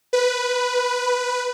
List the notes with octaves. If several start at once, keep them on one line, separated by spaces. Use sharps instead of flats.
B4